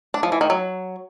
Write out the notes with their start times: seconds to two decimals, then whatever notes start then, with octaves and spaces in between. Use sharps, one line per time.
0.14 D4
0.23 F3
0.32 E3
0.41 D#3
0.50 F#3